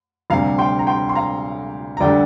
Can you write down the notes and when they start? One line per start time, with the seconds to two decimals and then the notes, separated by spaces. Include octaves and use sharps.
0.30 D2 C3 G3 F5 A#5
0.58 G5 C6
0.79 A#5
0.87 G5 C6
1.09 C6
1.15 F5 A#5
1.97 A#5
2.01 D2 D3 G3 D5 G5